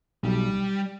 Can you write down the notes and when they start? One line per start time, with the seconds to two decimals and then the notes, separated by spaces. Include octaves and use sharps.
0.23 B1 G3